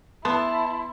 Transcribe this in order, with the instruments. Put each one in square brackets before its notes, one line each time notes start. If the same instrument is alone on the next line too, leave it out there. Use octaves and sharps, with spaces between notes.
[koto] B3 [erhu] E4 [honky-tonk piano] A5 [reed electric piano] C6